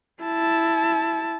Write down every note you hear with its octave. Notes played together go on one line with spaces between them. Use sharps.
E4 A5